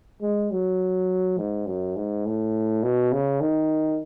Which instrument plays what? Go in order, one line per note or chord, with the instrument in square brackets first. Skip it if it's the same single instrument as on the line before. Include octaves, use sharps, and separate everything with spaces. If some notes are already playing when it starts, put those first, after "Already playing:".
[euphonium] G#3
F#3
G#2
F#2
G#2
A2
B2
C#3
D#3